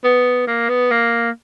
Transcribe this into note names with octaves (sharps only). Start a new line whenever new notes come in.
B3
A#3
B3
A#3